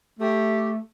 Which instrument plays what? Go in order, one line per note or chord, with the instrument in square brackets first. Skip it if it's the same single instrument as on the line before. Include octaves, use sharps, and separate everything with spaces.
[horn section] A3 [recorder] G4